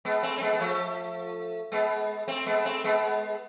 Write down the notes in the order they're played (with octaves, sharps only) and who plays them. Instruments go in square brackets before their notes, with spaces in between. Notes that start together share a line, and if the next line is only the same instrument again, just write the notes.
[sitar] G#3 B3
A3 C4
C4
G#3 B3
B3
F3 A3
G#3 B3
A3 C4
G#3 B3
A3 C4
G#3 B3